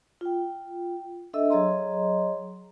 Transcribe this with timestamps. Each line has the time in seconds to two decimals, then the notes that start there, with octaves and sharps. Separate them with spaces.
0.21 F4 G5
1.33 D4 A4 D#5 E5 E6
1.50 F#3 G#4 C#5 D#5 A#5 C6